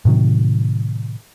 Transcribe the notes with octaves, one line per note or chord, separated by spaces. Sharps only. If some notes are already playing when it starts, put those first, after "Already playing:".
A2 C3 D#3 F#3